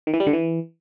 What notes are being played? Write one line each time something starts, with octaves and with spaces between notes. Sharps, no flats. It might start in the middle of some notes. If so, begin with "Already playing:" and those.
D#3
E3
G3
D3
E3